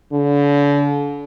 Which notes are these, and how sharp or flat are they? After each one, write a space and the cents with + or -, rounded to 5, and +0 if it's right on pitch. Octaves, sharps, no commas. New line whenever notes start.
D3 -40